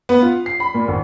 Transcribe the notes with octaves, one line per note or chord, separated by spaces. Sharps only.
B3
F4
C7
B5
A#2
G#1